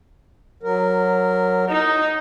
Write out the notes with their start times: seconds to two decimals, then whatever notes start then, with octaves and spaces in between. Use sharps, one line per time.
0.63 F#3 A#4
1.70 D#4